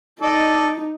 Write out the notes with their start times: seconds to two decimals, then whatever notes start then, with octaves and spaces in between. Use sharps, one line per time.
0.22 D#4 A4 D5 D#5